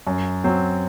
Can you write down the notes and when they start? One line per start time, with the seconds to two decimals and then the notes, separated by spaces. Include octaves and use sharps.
0.07 F#2
0.44 F#3 C4